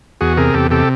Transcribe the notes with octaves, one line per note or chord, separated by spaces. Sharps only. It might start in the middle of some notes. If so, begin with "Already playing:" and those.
E2 F#4 G#4
C3 G#4 A#4
E2 G4 A4
C3 G4 A4